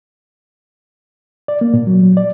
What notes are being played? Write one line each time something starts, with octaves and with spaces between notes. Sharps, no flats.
D5
A#3
A#2
F#3
F#3
D5